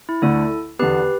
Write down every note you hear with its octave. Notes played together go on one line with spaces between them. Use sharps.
E4
D2 D3 A3 E4 A4
E2 D3 B3 G4 B4